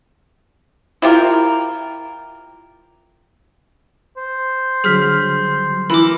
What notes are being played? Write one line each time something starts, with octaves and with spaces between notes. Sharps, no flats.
E4 F4 G4 A#4
C5
D3 F#3 G3 G#4 F6 B6
E3 A#4 B5 D6